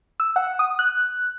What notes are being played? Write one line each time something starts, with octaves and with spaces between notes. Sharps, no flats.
E6
F#5
D#6
F#6